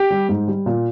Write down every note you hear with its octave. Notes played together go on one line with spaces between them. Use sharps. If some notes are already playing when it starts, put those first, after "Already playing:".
Already playing: G4
G3
G#2
G3
A#2